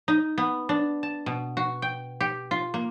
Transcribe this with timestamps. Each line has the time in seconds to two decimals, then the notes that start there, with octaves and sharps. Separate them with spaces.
0.08 D#4
0.38 B3
0.69 D4
1.03 A5
1.26 B2
1.57 F#4
1.82 G5
2.20 G4
2.51 F4
2.74 A#3